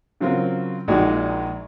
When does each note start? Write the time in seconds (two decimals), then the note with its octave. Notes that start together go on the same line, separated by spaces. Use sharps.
0.20 C#3 F#3 C4 F4 A#4
0.88 A#1 A#2 G#3 D#4 F#4